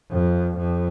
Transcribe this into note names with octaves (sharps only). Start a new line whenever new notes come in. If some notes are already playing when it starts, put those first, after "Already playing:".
F2
F2